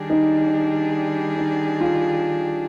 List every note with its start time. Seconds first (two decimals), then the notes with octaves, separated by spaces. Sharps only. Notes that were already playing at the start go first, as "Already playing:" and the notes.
Already playing: D#3 G3 D4 G#4
0.10 D#4
1.37 D#4
1.81 F4